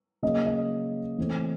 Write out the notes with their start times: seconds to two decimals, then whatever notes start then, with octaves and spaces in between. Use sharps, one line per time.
0.23 C#3 F#3 A#3 D#5
0.46 D#5
1.18 A2 E3 A3 C4